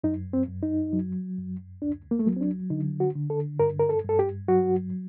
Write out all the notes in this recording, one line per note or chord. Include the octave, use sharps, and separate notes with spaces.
F#2 D#4
C4
F#2
D#4
F#3
F#2
D2 D4
A#3
A3
F#3 A#3
C4
D4
D3 D#4
F#4
D3
A4
G2 A#4
A#4
A4
G2 A4
G4
F#3 F#4